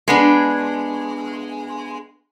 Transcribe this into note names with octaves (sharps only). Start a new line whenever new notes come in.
G#3 B3 D4